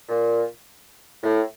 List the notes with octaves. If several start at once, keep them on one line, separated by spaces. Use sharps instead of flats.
A#2
A2